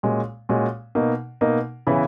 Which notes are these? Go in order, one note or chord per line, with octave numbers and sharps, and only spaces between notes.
A#2 G#3 C#4 F#4
A#2 G#3 C#4 F#4
B2 A#3 D#4
B2 A#3 D#4
C#3 E3 B3 E4